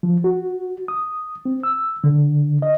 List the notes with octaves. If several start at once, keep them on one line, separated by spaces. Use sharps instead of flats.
F3
F#4
D#6
C4
E6
D3
D#5